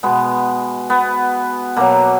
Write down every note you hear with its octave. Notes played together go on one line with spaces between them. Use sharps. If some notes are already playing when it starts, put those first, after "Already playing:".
B2 G#3 B3
B3
B2 F#3 A#3